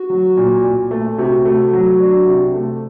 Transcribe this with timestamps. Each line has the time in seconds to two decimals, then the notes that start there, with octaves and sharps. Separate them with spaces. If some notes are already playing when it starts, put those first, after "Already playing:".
Already playing: F#4
0.10 F#3
0.37 A#2
0.64 A#2
0.91 A3
1.18 C3 F#4
1.45 A3
1.73 F#3
2.00 D4
2.27 C3
2.54 A3